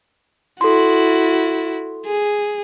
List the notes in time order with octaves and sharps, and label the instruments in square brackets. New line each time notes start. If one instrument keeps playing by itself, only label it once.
[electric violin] E4 F#4 [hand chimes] A4 C6
[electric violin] G#4